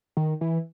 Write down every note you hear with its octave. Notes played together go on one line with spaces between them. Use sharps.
D#3
E3